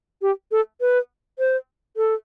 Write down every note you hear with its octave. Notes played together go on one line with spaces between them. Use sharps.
G4
A4
B4
C5
A4